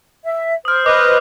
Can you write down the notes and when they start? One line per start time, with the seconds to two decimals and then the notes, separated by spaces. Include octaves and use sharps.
0.24 E5
0.65 C5 D#6 F6
0.86 B4 D#5 D6